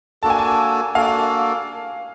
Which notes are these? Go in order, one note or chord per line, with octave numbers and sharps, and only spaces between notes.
A#3 D4 F#4 A4 A5
G#5
A5
A#3 D4 F#4 A4 F5